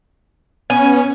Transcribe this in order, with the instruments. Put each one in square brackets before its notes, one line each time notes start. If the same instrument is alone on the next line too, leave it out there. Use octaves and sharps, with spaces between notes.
[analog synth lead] B3 [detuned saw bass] C#4 [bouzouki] G#5